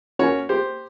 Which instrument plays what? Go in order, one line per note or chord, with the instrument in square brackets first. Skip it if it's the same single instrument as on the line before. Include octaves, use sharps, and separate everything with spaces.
[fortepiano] C#4 F#4 A#4 C#5
G4 C5